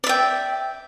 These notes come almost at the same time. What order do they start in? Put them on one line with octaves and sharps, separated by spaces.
D5 E5 G5